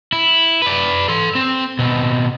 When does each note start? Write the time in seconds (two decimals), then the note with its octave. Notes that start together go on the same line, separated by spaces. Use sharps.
0.12 E4
0.62 B4 D5
1.08 A4 C6
1.35 C4
1.79 B2 C4